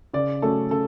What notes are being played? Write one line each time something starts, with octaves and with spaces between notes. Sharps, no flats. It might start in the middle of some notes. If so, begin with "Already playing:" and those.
C#3 D5
F#3 A3 C#4 A4
C#3 A4